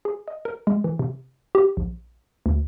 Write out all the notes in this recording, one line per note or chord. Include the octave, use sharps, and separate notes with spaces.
G#4
D#5
A#4
G#3
E3
C3
G4
A#1
D2